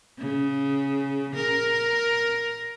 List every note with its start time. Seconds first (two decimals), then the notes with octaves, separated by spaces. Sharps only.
0.18 C#3
1.36 A#4